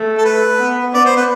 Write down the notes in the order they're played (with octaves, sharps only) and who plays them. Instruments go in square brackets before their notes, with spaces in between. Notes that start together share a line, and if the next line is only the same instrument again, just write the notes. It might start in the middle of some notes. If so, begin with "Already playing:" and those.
Already playing: [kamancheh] A3
[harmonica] A4
B4
[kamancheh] B3
[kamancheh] B3 [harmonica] D5
[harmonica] C5
B4